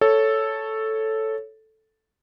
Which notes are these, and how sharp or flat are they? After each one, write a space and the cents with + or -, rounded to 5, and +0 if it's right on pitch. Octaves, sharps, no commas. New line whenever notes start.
A4 +0 C#5 +0